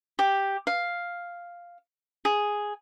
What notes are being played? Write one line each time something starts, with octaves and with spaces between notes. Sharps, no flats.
G4
F5
G#4